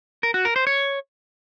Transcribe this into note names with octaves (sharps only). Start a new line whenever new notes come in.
A#4
F#4
A#4
C5
C#5